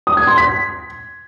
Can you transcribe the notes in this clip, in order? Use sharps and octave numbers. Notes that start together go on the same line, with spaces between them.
D#6
G#6
C6
B6